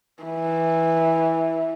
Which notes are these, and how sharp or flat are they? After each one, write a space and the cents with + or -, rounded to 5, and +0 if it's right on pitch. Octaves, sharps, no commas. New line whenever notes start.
E3 -10